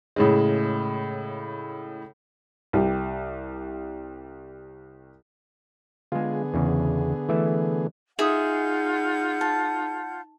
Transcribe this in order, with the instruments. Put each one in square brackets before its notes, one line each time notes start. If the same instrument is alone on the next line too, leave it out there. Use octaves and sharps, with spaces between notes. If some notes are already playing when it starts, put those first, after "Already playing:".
[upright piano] A2 C#3 G#3
C2 G4
[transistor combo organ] D3 B3 G#4 [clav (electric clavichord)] G#3 F4
[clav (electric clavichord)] E2 C#3
E3 A3 E5
[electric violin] D#4 [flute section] F4 F#5 G6 [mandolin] G#4 [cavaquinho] E5 D#6
[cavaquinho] A5